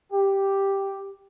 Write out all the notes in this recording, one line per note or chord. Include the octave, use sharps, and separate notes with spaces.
G4